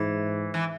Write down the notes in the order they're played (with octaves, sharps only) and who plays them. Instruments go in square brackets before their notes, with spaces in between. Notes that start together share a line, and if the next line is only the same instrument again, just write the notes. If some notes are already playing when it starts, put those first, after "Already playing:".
Already playing: [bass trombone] G#2 [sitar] E3
[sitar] E3